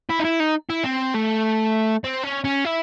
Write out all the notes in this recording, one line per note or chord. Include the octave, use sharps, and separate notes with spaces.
E4
D#4
E4
D#4
E4
C4
A3
C4
C#4
C#4
E4